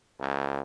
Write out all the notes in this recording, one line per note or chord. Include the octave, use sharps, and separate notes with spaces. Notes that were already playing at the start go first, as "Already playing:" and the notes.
C#2